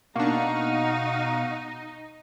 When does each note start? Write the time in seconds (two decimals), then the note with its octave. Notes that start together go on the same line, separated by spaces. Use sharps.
0.16 B2 A#3 D4 D#4 F5 F#5 C#6